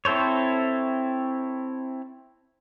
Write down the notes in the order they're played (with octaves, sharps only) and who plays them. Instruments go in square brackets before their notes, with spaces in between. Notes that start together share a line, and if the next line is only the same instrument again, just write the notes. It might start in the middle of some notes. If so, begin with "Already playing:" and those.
[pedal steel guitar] C4 E4 A4 C5 C#5